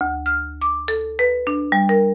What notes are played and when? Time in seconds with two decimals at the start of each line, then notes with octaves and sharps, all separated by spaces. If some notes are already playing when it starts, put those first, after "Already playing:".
0.01 D2
0.26 F6
0.62 D6
0.88 A4
1.19 B4
1.47 D4
1.72 G3
1.89 A#4